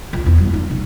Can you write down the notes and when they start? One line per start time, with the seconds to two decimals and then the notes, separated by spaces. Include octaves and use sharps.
0.13 C#2
0.26 E2
0.38 G3
0.53 D#4
0.70 C#3